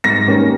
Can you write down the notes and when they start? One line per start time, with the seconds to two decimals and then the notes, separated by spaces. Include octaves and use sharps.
0.04 G#2 A#6
0.28 D#3 G3 A#3 C#4